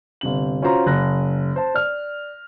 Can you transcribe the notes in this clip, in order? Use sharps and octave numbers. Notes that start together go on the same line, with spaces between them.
G1 C3 F#7
C#4 F4 F#4 C5 A#5 C6
F#1 F#6 A#6
C5 A5
D5 F6